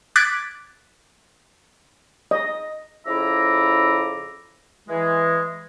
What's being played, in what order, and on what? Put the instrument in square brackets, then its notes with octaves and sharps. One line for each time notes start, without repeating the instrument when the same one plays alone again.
[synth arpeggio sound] D6 F#6 G#6 A6 B6 D7
[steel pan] D#5
[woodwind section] F2 C#3 E4 E5 A#5 D6
E3 G#3